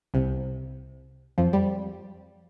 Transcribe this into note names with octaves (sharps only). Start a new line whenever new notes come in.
C2 C3
F2 F3
G3